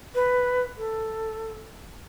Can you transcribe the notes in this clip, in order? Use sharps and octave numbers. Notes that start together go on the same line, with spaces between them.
B4
A4